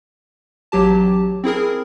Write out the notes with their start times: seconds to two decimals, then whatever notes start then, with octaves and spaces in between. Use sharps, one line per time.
0.72 A1 F#3 G4 A5
1.44 C4 E4 G#4 A#4